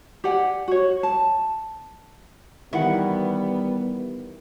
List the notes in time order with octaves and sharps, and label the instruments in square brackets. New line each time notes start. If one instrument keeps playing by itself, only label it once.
[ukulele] G4 D5 F#5 G#5
F#4 C#5
A5
[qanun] D#3 E3 [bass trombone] G3 [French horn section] B3 [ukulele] E4 F#5